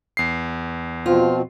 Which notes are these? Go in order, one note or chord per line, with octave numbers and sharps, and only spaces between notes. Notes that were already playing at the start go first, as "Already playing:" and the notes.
E2 C7
B2 F3 C4 F4